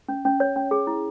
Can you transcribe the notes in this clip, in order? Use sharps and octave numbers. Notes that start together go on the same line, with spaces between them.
C#4
C#4
C#5
C#4
G#4
E4